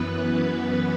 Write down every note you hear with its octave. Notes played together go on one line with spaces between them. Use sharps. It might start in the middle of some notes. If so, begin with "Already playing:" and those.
Already playing: F#2 E3 B3 B4